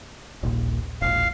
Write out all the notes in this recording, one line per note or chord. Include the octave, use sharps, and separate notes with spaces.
D#1 A#1 A#2
E1 A#1 F5